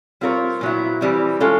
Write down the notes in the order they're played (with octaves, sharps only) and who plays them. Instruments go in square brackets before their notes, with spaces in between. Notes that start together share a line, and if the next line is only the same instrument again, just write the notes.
[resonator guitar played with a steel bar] G3 C4 F4 A#4 C#5
A#2 F#3 B3 E4
E3 G3 C4
E3 G#3 C#4 F4 A4